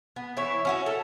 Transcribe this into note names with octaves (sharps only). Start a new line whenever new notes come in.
B3
E3 E4 C#5
C#4 F#4 E5
A4